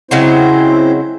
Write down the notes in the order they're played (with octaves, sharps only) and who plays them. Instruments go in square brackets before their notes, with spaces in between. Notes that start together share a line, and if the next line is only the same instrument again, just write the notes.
[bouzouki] C#3 F#3 G#3 [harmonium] C4 E4 C5